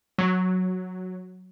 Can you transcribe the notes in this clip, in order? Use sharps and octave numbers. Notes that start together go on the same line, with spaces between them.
F#3